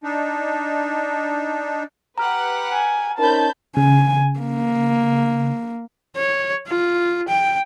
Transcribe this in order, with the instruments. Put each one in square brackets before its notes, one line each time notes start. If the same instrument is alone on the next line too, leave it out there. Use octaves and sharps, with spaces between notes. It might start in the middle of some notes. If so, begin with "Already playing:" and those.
[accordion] D4 D#4
[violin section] G4 B4 F#5 [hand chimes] A#5 F6
[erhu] G#5
[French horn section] C#4 D#4 A#4 [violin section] C5 B5 G6 [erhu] A5
[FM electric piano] C#3 [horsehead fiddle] G#5
[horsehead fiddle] A#3
C#5
F4
G5